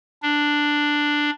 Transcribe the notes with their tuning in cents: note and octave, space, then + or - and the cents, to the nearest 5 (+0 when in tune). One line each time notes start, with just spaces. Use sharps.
D4 +5